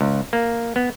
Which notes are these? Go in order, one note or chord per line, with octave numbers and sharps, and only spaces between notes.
C#2
A#3
B3